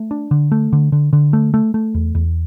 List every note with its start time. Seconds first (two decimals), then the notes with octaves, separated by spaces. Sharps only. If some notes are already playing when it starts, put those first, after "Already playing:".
Already playing: A3
0.11 D4
0.31 D3
0.52 A3
0.73 D3
0.92 D3
1.13 D3
1.33 A3
1.54 A3
1.74 A3
1.94 E2
2.15 E2